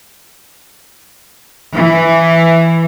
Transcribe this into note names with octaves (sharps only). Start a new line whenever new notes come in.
E3